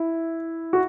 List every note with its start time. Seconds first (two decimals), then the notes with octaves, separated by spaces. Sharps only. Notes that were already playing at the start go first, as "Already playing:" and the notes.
Already playing: E4
0.73 F#4